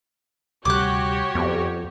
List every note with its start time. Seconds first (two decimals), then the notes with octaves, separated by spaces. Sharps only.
0.65 D2 C3 G3 F#4 G4 C#5 D6 F#6
1.35 F2 B3